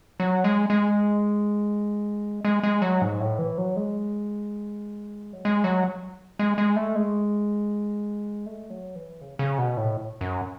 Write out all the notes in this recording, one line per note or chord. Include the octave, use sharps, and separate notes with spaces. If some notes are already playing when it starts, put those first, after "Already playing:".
F#3
G#3
G#3
G#3
G#3
F#3
G#2
A2
E3
F#3
G#3
F#3
G#3
F#3
G#3
G#3
A3
G#3
A3
F#3
E3
C#3
C#3
B2
A2
F#2